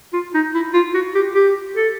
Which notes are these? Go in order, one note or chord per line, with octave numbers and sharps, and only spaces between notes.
F4
D#4
E4
F4
F#4
G4
G4
A4